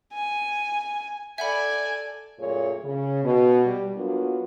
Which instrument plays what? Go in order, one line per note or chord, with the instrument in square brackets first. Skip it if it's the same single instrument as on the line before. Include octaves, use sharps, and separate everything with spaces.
[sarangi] G#5
[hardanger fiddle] A4 D5 [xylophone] E5 F#5 B5 [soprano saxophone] G#5
[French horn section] F#2 A#2 A3 F4 G#4 C#5
C#3
B2
G3 G4
F#3 A#3 B3 D4 F4 F#4